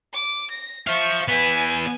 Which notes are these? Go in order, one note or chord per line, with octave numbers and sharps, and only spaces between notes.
D6
A#6
C5 E5 F5 C#6
B3 E4 B4 G#5